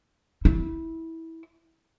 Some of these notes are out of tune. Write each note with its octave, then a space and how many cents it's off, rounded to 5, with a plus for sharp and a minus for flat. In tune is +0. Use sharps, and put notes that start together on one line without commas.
E4 -20